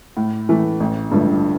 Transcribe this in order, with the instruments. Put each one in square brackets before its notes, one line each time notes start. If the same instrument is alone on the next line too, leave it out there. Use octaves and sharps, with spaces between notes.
[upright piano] A2
E3 A3
A1
G2 D3 F3 A3